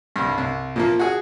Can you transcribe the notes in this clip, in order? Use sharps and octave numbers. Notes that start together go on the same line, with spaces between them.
C2 G2
C2
A#2 F3 A#3
F#4 G#4